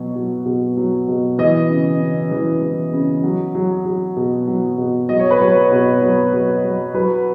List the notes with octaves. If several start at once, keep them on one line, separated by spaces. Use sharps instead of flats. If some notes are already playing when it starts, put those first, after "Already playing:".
Already playing: B2 F#3
F#3
B2
F#3
B2
E3 D#5
C#3
C#3
E3
E3
C#3
F#3
F#3
F#3
B2
F#3
B2
F#3 D#5
C#5
B4
F#3 C#5
B2
F#3
F#3
F#3
F#3 B4